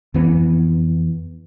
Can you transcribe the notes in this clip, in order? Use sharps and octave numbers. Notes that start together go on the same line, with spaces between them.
F2 E3 B3